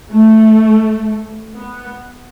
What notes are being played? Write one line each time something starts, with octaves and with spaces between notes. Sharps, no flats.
A3
B3